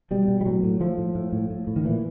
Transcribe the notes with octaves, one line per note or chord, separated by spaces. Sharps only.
B2 G3
B2
G3
A2 F#3
A2
A2 F3
A2
A2
A2
A2
A2
D#3
A#2 E3